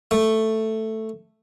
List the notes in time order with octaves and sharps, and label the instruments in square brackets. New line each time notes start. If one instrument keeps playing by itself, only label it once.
[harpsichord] A3